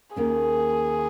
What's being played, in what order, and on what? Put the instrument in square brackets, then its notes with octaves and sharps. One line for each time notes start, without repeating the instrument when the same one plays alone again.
[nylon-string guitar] D#2 D#3 A#3 C#4 [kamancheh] G#4